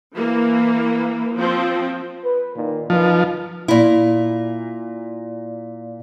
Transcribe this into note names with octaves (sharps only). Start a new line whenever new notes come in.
E3 A#3
F3 C4
B4
A#2 D#3
F#2 F3 D#4 B4
A#2 E4